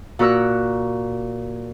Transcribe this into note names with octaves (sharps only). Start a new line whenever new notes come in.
A#2 F#4 A#4 E6 F#6